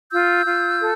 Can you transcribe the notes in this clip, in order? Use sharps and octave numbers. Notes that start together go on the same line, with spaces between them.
F4 E6 G6
F4
A4